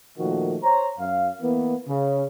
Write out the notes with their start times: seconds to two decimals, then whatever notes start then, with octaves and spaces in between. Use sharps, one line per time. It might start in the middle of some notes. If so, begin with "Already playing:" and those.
0.17 A#2 D#3 F3 A3 F#4
0.63 C5 C#5 A#5
0.98 F#2 F5
1.40 E3 A#3 B3
1.87 C#3